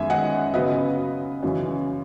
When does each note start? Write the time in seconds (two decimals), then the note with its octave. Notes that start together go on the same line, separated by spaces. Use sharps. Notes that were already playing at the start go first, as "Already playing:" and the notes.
Already playing: F#2 D#3 G#3 B3 E5 G#5
0.10 D#5 F#5
0.54 C#3 F#3 B3 B4 D#5
1.43 F#2 C#3 E3